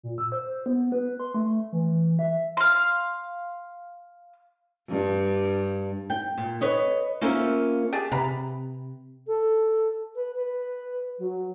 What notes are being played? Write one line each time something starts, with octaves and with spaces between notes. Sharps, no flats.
A#2
E6
C5
B3
B4
C6
A3
E3
E5
F5 C6
G2
G5
A#2
B4 C#5 D#5
A#3 C#4 F4 A#4 C5 E5
G4 G#4 A5
C3 B4 A#5 B5
A4
B4
B4
F#3